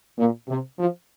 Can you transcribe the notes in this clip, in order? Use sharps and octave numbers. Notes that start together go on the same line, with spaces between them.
A#2
C3
F3